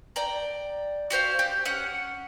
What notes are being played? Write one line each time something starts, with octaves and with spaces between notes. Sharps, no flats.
D5 G5 A#5
F#4 G4 C5 F5
G4
C#4 F#5